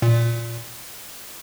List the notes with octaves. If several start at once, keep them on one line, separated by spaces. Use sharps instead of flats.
A#2